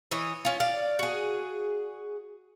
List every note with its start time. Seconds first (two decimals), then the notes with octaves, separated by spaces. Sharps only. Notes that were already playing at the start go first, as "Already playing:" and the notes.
0.11 E3 C#5 D#5
0.45 C#4 F4
0.60 D5 F5
0.99 F#4 G#4